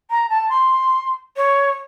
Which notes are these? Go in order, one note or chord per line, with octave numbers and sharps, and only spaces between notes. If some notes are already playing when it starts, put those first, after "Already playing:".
A#5
A5
C6
C#5